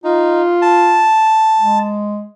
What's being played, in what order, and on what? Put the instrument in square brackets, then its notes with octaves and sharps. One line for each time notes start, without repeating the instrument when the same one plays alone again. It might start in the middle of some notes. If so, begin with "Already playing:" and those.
[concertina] D#4 [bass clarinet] F4
[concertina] A5
[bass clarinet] G#3